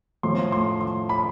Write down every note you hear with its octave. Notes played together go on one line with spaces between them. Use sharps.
A2 F3 A3 C6
C6
C6
B5